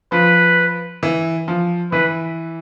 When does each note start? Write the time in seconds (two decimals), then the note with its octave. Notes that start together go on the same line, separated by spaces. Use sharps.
0.12 F3 B4
1.03 E3
1.48 F3
1.92 E3 B4